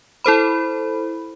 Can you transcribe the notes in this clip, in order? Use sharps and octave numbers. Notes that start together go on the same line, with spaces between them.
E4 A4 C5 B5